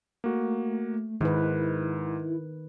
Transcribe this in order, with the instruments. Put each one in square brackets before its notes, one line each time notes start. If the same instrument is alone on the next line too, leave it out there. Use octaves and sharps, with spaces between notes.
[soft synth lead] A3 [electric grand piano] A#3 F#4
[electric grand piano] G#2 [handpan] D#3 B4 [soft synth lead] E4